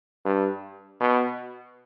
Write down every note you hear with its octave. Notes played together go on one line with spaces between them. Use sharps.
G2
B2